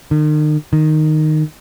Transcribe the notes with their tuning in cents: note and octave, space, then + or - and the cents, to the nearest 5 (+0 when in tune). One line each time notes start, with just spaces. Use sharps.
D#3 -40
D#3 -10